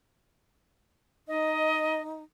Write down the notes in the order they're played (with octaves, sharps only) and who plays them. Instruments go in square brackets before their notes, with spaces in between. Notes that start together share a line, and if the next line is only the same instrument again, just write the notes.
[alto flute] D#4 [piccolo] D#5